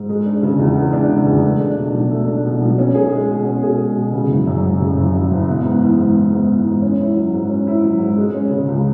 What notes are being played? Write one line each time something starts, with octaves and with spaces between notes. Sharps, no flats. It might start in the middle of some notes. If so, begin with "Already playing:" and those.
Already playing: G#2
G#3
D4
C#3
E2
G#3
D4
C#3
E2
A3
D4
B2
B1
A3
D4
B2
B1
C#4
G#4
G#3
B2
C#4
G#4
G#3
B2
C#3
F#1
F#2
F#1
C#3
F#1
F#2
F#1
B3
G#2
E3
G#2
B3
G#2
E3
G#2
C#4
E4
F#3
G#2
C#4
E4
F#3
G#2
G#3
C#4
C#3
C#2